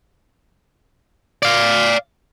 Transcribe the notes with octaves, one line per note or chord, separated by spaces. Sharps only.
D5 F5